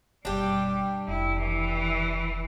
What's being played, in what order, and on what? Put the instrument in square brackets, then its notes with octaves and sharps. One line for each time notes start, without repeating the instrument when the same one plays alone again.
[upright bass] F#1 B2 [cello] G3 [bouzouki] D4 G4
[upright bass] F1 D#3 [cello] E4
[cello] E3